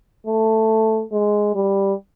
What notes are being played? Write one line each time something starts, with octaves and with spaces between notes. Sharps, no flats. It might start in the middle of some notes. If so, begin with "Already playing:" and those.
A3
G#3
G3